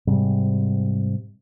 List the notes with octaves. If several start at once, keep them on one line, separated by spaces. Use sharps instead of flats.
G#2 C3 G3